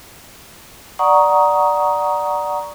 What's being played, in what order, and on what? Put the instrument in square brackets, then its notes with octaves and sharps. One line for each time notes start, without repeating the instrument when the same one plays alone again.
[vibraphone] D5 F#5 A#5 C#6 D#6